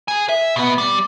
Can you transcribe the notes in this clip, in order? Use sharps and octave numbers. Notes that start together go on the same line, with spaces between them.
G#4 G#5
E5
B2 B3
G3